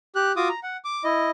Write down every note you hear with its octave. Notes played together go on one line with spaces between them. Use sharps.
G4 F#6
F4 F#4 D6 D#6
A#5
F#5
D6
E4 D#5